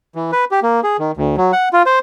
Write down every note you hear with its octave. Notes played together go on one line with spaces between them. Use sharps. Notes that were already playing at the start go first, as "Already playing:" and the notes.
E3
B4
G4
A#3
G#4
D#3
D2
F#3
F#5
F4
C5